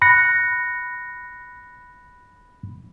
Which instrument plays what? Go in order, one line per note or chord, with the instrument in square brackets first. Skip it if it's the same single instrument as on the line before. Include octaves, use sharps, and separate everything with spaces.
[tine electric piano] B5 F#6 A#6 C#7